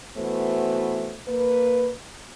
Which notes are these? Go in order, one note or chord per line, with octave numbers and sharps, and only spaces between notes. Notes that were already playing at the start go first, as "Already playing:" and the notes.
E3 A3 B3 F#4 C5
A#3 B4